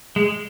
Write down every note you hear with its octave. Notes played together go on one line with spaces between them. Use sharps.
G#3